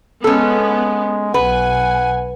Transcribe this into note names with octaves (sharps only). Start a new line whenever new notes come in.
G#3 B3 C#4 A4
B1 B4 F#5 G#5